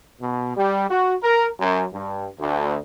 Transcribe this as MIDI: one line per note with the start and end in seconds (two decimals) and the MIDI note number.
0.21 0.54 47
0.56 0.86 55
0.88 1.13 66
1.22 1.46 70
1.60 1.83 42
1.93 2.26 43
2.39 2.75 38